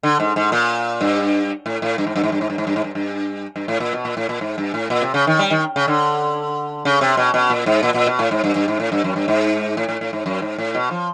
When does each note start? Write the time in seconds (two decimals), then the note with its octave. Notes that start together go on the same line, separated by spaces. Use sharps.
0.03 D3
0.20 G#2
0.36 G#2
0.52 A#2
1.01 G2
1.66 A2
1.82 A2
1.98 G2
2.07 G#2
2.16 G2
2.24 G#2
2.32 G2
2.41 G#2
2.50 G2
2.58 G#2
2.67 G2
2.76 G#2
2.84 G2
2.95 G2
3.56 G2
3.68 A2
3.80 A#2
3.93 B2
4.05 A#2
4.17 A2
4.29 A#2
4.41 G#2
4.58 G2
4.74 A2
4.90 A#2
5.02 C3
5.14 C#3
5.27 D#3
5.39 G3
5.51 D#3
5.76 C#3
5.88 D3
6.85 C#3
7.01 C3
7.17 B2
7.34 B2
7.50 A#2
7.66 G#2
7.83 A#2
7.94 A#2
8.06 B2
8.19 A2
8.31 G#2
8.44 G2
8.56 G2
8.68 G#2
8.80 A2
8.92 G2
9.04 F#2
9.16 G2
9.28 G#2
9.77 A2
9.89 A2
10.01 A2
10.13 G#2
10.26 F#2
10.42 G#2
10.58 A2
10.75 B2
10.91 F3